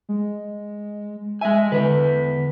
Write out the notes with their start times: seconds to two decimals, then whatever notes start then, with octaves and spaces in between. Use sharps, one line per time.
0.09 G#3
1.41 G#3 E5 G#5
1.72 E2 A#2 D3 B4